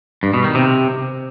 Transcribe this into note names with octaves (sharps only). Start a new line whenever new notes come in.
G2
B2
D#3
C3